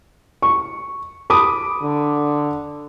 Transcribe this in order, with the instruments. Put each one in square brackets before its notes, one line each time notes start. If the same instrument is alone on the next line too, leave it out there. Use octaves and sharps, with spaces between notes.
[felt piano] C#6
B5 D6 D#6
[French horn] D3